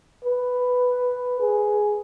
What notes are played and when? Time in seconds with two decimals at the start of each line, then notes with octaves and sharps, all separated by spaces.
0.24 B4
1.40 G#4